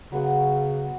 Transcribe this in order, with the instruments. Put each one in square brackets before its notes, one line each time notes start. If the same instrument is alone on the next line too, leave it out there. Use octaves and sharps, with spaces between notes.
[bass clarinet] C#3 [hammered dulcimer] F#3 B3 F#4